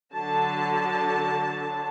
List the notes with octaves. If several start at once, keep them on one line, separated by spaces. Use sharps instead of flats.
D3 F#3 A5